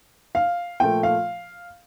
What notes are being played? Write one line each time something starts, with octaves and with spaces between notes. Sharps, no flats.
F5
A#2 F3 A3 G5
F5